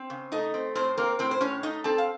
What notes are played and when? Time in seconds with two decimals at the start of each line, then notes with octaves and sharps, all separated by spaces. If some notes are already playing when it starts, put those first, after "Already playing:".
Already playing: C4
0.10 C#3
0.32 A3 D#4 D#5
0.54 C4
0.75 A2 C4 C5
0.97 A#3 C4 A#4
1.19 A2 C4 C5
1.31 C5
1.41 A2 C#4 C#5
1.63 A3 D#4 D#5
1.84 C4 A4 A5
1.98 F5